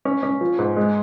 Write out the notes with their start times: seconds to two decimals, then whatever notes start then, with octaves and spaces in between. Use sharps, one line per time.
0.05 C#4
0.23 C#4
0.41 F3
0.59 G#2
0.77 G#3